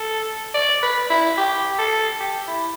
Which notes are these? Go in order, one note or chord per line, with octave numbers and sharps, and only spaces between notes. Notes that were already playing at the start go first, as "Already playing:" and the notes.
Already playing: A4
D5
B4
E4
G4
A4
G4
E4